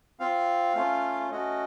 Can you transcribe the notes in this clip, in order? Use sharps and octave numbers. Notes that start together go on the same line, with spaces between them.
C4 F4 F5
A3 C#4 F4
A3 C#4 F#4 D#5